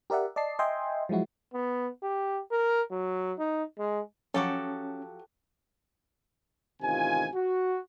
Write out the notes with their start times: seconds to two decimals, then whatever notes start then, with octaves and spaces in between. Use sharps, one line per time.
0.10 G4 A#4 D5 E5 F#5
0.36 D5 D#5 A5 C7
0.59 D#5 E5 G5 G#5 C6
1.09 F3 F#3 G#3 E4 F#4
1.54 B3
2.03 G4
2.51 A#4
2.91 F#3
3.38 D#4
3.78 G#3
4.34 F3 F#3 C#4 F#4 G4 A4
6.82 A1 C3 D#3 F4 G#5
7.34 F#4